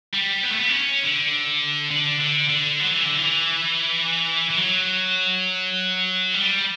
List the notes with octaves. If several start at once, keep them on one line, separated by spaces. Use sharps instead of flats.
G3
B3
A3
B3
D4
C#4
D3
D3
D3
D3
F#3
E3
D3
E3
E3
F#3
G3